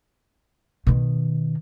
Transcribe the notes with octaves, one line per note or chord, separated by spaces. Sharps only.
B2 D#3